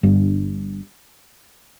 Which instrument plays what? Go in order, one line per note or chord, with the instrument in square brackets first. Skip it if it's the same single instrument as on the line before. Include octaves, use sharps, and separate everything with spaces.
[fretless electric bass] G1 G2